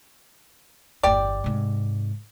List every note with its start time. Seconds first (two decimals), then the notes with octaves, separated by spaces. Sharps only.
1.03 G1 E2 G4 D5
1.44 G#2 C3